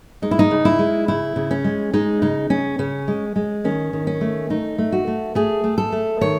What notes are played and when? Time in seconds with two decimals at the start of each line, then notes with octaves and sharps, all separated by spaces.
0.22 G#3 D#4
0.31 E4
0.39 D#4
0.51 C#3
0.65 E4
0.79 G#3
1.08 C#3 E4
1.36 C#3
1.51 C#4
1.64 G#3
1.94 G#3 D#4
2.22 C#3 D#4
2.50 C#3 C#4
2.79 C#3 C#4
3.08 G#3
3.36 G#3
3.64 D#3 C#4
3.93 D#3
4.07 C#4
4.21 A3
4.50 A3 D#4
4.78 A3
4.92 F#4
5.07 A3
5.35 A3 G#4
5.64 A3
5.78 A4
5.92 A3
6.21 D#3 C#5